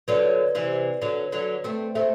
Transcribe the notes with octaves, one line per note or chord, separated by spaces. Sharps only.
D3 F#3 B4 D5
C3 E3
D3 F#3
D3 F#3
A3 C4
A3 C4 C5 E5